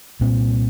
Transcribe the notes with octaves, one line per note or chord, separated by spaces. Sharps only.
C2 A#2 G3 C4